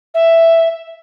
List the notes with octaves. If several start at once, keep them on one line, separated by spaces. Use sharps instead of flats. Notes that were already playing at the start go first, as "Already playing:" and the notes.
E5